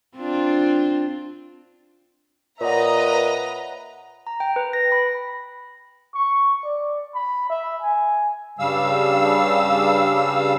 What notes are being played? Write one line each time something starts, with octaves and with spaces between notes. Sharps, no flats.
C4 D4 F4
A#2 B4 C#5 D#5 E5 F#5 A#5
A#5
G5
B4
A#6
B5
C#6
D5
B5
E5
G#5
G2 C#3 G3 F5 E6